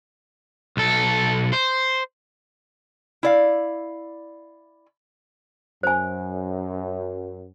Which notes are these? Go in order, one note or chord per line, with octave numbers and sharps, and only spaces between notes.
B1 A4
C5
E4 D5 F5
F#2 C5 G#5